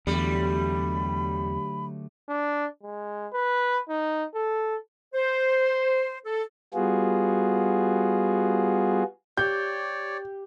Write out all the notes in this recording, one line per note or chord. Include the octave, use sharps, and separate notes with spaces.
E2 D3 F#3 G3 A3 B5
D4
G#3
B4
D#4
A4
C5
A4
G3 B3 F4 F#4 G#4
G4 C#5 D5 F5 G6